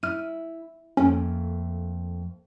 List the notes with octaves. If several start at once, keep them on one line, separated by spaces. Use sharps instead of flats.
E4 F6 D#7
F2 A3 A#3 C#4